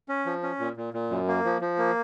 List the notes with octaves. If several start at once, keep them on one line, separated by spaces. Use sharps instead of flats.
C#4
F3
C#4
A#2
A#2
A#2
F#2
A#3
F3
F3
A#3